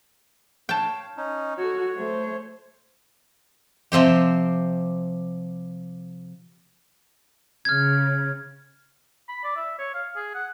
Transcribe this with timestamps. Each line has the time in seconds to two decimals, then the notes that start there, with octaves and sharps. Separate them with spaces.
0.69 C#5 F5 G5 A5
1.17 C#4 D#4
1.58 F#4 A4 C#5
1.96 A3 C5
3.92 C3 F3 C4 G4
7.65 C#3 F6 G#6
9.29 B5
9.44 D5
9.56 E5
9.79 C#5
9.94 F5
10.17 G#4
10.35 F#5